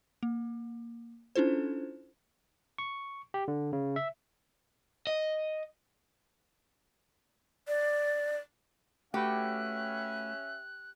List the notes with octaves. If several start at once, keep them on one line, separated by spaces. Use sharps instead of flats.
A#3
C#4 D4 E4 F4 A4 C5
C#6
G4
D3
C#3
E5
D#5
D5
A3 C#4 F#4 G4 B4 E5 F#6